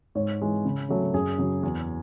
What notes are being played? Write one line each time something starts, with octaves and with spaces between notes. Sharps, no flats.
G#2 C#5
E3 G#3
C#3
F#3 A3 C#4
F#2 G#4
C#3 F#3
E2